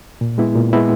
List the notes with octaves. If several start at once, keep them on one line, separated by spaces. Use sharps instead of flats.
A#2
G#3 B3 E4
A#2
G#3 B3 E4